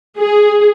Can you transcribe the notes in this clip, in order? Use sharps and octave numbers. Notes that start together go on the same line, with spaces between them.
G#4